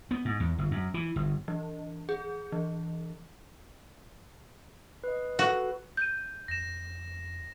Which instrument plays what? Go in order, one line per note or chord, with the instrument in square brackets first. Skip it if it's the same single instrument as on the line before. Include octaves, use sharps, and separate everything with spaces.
[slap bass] B3
G#2
E2
G1
F#2
E3
G1
[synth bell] E3
G#4
E3
[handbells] B4 D#5
[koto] F#4 [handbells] A4 B4
[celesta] G6 D#7
[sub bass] F2 [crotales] A#6 E7